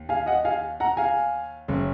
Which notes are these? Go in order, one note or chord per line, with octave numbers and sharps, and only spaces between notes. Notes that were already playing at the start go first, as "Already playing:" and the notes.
Already playing: D#2
F5 G#5
D#5 F#5
F5 G#5
F#5 A#5
F5 G#5
F#1 C#3